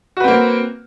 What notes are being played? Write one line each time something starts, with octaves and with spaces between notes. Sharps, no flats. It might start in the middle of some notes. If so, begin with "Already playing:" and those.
A#3 C4 F#4 B4